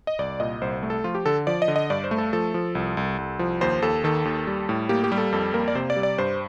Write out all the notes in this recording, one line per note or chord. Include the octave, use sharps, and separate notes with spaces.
D#5
C2 D5
A#2 D#5
C2 C5
A3
A4
F3 F4
G4
D3 A4
F3 D5
D#5
D3
D#5
G2 D5
C5
A3
A4
F3 A4
F3
C2
C2
C2
F3
D#2 C5
D#2 A4
D#3 A4
D#2
G3
A2
A#3 G4
G4
G3
A4
F2 A4
A#3 A#4
D5
C3 C5
D5
G3
D5
G2 C5